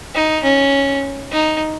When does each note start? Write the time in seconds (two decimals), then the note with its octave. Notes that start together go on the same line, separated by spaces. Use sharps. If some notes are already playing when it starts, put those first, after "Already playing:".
0.15 D#4
0.43 C#4
1.32 D#4